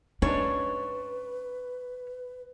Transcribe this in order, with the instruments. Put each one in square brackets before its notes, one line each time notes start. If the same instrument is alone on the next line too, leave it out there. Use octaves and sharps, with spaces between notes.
[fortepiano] G#2 D4 [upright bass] C#4 [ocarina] B4 [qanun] C#5